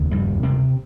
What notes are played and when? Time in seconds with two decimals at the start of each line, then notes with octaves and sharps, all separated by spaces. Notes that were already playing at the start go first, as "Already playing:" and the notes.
Already playing: F1 D#2 C#3
0.11 G2 G3
0.43 C3 C4